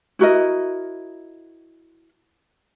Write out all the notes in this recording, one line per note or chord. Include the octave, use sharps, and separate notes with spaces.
E4 F#4 A#4 D#5